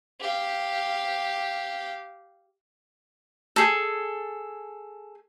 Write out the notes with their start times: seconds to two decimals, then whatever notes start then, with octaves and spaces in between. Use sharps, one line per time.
0.20 G4 F5
3.56 G#4 A4